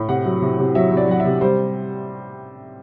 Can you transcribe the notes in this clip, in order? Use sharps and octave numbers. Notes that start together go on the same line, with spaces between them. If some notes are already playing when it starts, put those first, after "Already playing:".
Already playing: A2
C3 F#5
F#3
C3
C3
F#3 E5
C3
D5
F#3 F#5
E5
C3
G3 C5